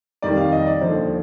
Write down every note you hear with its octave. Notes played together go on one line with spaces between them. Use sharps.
F2 D#3 G3 D5
F5
D#5
D5
D#2 D3 F3 C5